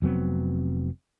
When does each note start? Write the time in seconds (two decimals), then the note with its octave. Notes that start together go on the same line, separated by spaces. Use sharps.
0.02 F1 F#3 B3 C4